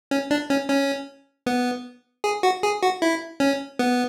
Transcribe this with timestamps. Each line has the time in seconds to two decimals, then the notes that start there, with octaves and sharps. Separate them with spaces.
0.11 C#4
0.31 D4
0.50 C#4
0.69 C#4
1.46 B3
2.24 G#4
2.43 F#4
2.63 G#4
2.83 F#4
3.02 E4
3.40 C#4
3.79 B3